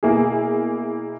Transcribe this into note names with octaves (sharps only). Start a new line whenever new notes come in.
B2 A#3 E4 G#4